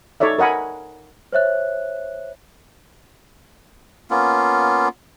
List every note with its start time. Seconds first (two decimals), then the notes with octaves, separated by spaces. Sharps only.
0.20 D#4 A4 C#5 D5 E5
0.38 A#4 D#5 F#5 G#5 B5
1.33 C5 C#5 E5 F#6
4.11 A#3 B3 C#4 F4